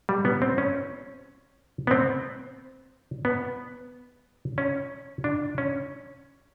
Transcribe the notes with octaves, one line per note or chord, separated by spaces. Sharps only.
G3
B3
C4
C#4
B3
C4
B3
C#4
D4
C#4